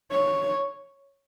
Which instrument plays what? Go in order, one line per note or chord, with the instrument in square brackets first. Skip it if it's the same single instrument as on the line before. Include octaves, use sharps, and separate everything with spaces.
[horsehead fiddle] C#5